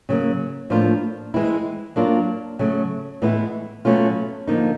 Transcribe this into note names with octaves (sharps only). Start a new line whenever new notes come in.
C#3 F#3 A#3
A2 F3 A#3 D4 F4
E3 G#3 C4 E4
F#3 A#3 D4 F4
C#3 F#3 A3
A2 E3 G#3 B3 E4
B2 F#3 A3 C#4 F4
D3 F3 A#3 D#4